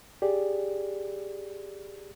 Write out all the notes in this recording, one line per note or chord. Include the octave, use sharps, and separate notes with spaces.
G4 G#4 D5